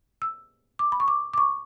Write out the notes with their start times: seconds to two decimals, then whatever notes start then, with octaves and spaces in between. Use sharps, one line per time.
0.22 E6
0.79 D6
0.92 B5
1.00 C#6
1.08 D6
1.33 D6
1.38 C#6